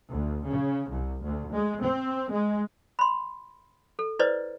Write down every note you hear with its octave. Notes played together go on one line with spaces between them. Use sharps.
D2
C#3
C2
D2
G#3
C4
G#3
B5 C6
A4
E4 B4 C5 D5 D#5